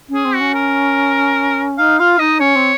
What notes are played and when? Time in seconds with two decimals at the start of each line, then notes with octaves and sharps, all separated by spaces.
0.09 C#4
0.14 G#4
0.24 C4
0.35 F#4
0.40 C#4
0.55 A#4
1.78 D#4 F5
1.99 F4 F5
2.19 D#4 D#5
2.40 C#4 C#5
2.55 C4